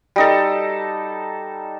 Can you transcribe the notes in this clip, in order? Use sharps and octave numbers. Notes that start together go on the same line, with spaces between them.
G3 D#4 A4